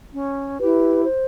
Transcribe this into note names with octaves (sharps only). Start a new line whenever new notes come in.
C#4
E4 G4 B4
C5